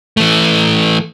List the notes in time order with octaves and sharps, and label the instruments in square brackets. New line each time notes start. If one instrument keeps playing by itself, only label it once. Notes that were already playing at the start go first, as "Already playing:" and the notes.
[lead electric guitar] E3 A3